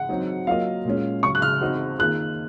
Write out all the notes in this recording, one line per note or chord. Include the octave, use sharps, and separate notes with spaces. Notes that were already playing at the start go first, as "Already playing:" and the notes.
Already playing: F#5
F#3 C4 D#4
F#3 A#3 F4 A#4 D#5 F5
A#2 G#3 C#4
C#3 F#3 C#4 C#6
F#6
F6
C4 D#4 F#4 C5 D#5
D#3 A#3 F4 G#4 F#6